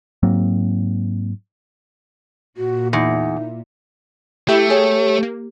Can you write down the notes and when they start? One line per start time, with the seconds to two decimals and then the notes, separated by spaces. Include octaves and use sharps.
0.23 G#2 F#3 A#3 C4
2.57 A#2 F#4
2.93 E2 D#4
4.49 A3 E4 G4 E5 D6
4.70 G#4 C#5
5.23 A#3